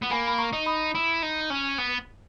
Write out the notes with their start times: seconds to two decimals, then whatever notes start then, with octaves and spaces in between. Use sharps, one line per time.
0.02 B3
0.11 A#3 G#5 B5
0.27 B5
0.38 A#5 C#6
0.53 D#4
0.66 B5 D#6
0.95 E4
1.22 D#4
1.50 C#4
1.78 B3